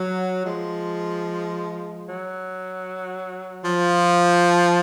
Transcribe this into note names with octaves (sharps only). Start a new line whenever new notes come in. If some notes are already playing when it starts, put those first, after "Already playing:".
Already playing: F#3
F3 G#3
F#3
F3